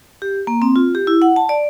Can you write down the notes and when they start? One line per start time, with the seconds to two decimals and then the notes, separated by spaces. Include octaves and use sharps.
0.22 G4
0.47 A#3
0.62 C4
0.76 F4
0.95 G4
1.07 E4
1.22 F#5
1.36 A5
1.49 D5